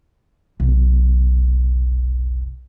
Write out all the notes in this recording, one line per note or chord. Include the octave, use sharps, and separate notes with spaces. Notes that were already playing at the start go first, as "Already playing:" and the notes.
F1 B1